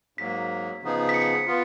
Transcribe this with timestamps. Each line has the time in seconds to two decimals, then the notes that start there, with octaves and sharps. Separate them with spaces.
0.18 G#2 F#3 A#3 B6
0.83 C#3 F3 B3 D#4 G#4
1.09 B6
1.14 C#7
1.46 B3 F4